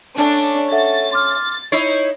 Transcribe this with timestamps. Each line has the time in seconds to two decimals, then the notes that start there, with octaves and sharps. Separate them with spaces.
0.17 A3 C#4 D4
0.72 A4 E5 F#5 A6
1.12 C6 D6 F6
1.72 D#4 E4 C#5 C7